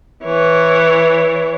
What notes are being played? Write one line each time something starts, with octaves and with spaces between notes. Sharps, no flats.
E3 C#5